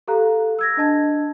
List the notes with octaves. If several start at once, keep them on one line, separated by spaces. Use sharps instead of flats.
G4 A4 F5 A#5 F#6
E6 G#6 A#6
D4 D#5 A5 G#6